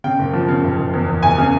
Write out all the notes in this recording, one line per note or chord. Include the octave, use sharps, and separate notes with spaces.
C#3 G5
F#1
F3
C#3
F#1
F#1
E2
E2
F#1 G#5
C#3